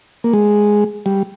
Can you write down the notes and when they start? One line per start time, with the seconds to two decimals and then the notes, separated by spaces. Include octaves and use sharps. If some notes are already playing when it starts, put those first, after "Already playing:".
0.24 A#3
0.33 G#3
1.06 G3